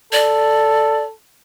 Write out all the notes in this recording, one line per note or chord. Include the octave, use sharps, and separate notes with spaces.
A4 D5